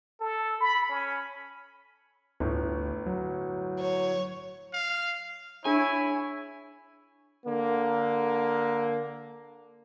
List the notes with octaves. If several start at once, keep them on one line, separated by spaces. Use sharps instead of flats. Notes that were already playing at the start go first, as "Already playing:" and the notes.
A4
B5
C#4
G1 D2 A2
F#3
C#5
F5
D4 E4 G#4 C#5 G#5
D3 A#3